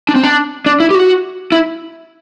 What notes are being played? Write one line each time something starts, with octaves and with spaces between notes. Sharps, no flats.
D4
C4
D4
D4
E4
G4
F#4
E4